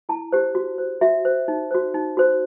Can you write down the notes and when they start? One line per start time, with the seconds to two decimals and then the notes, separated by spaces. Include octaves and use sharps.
0.09 E4 A5
0.32 G4 C5
0.55 F#4
0.78 C5
1.01 F#4 E5
1.25 C5
1.48 D#4
1.71 F#4 C5
1.94 D#4
2.17 F#4 C5